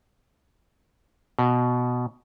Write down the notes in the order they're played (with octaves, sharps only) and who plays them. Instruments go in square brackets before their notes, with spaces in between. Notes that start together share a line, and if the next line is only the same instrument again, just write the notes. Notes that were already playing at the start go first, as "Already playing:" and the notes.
[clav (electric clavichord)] B2